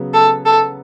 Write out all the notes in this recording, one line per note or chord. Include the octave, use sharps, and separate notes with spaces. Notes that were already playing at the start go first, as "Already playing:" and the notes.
Already playing: C#3 F#3 B3
A4
A4